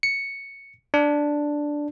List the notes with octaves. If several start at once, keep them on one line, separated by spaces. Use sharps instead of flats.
C#7
D4